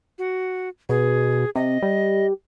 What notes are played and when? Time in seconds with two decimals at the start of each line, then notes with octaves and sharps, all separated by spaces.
0.18 F#4
0.89 B2 G#4
1.56 C3 D#5
1.83 G3